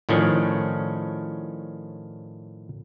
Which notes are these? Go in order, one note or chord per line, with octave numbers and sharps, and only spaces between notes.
A2 D#3 F3 C#4 D4